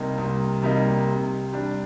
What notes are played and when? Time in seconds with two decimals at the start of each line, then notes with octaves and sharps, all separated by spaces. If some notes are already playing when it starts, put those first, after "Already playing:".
Already playing: C2 C3 G3 A#3 D#4
0.18 C2
0.62 C3 G3 A#3 D#4
1.07 C3
1.53 G3 D4